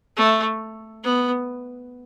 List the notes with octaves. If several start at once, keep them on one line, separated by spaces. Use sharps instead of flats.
A3
B3